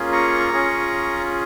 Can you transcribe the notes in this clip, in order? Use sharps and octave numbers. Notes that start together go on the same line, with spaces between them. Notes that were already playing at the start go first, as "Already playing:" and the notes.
Already playing: A#3 C#4 F4 G#4
A#5 C#6
C#4 F4 G#4